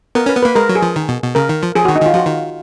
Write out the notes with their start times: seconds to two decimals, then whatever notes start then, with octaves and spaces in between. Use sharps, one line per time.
0.15 B3 A#4
0.26 C#4 B4
0.36 B3
0.43 A#3 B4
0.55 G#3 A#4
0.69 F#3
0.75 G#4
0.82 F3
0.96 D#3
1.09 B2
1.22 B2
1.35 C#3 A#4
1.49 D#3
1.63 F3
1.75 F3 G#4
1.85 F#4
1.88 D#3
1.96 D#4
2.02 D#3 F4
2.14 F3 F#4
2.26 D#3